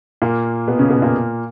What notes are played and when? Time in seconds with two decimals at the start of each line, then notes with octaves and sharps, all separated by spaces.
0.22 A#2 A#3
0.67 B2 B3
0.79 C#3 C#4
0.90 B2 B3
1.02 A#2 A#3